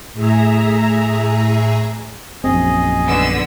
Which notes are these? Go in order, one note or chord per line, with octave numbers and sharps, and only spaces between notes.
A2 G#4 E5 A#5
A#1 F#2 C4 G#4 D#5
D3 B3 E6